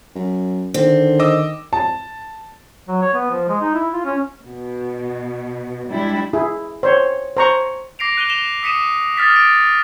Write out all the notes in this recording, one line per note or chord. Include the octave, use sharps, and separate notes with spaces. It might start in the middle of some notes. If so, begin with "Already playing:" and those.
F#2
D3 D#3 C4
D#5 D6 E6
A5
F#3
C#5
B3
F3
G#3
D#4
E4
F4
C#4
B2
G3 G#3 D4 E4
E4 G#4
C5 C#5
C5 A#5 C#6
D6 A#6 C7 D7 F7
F#6 D#7 F7 G7
E7 G7
D#6 B6 C#7 D#7 E7
D#6 F6 A6 B6
A6 D7